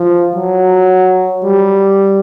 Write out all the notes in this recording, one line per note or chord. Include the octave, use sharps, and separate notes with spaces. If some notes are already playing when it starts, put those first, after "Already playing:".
Already playing: F3
F#3
G3